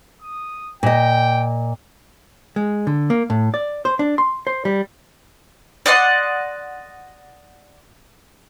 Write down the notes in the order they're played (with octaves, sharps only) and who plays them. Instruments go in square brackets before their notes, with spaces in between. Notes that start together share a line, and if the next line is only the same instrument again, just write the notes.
[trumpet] D#6
[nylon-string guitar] A#2 D#5 [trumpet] G5
[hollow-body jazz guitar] G#3
D3
A#3
A2
D5
C5
D4
C6
C5
G3
[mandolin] D5 D#5 F#5 C6